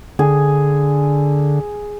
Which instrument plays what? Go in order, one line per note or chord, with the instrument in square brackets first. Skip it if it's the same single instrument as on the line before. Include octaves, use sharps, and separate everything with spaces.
[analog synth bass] D3 [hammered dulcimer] G#4